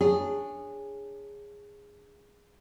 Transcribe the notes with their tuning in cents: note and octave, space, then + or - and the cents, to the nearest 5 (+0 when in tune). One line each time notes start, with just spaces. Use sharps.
D4 +0 G#4 -15 C#5 +0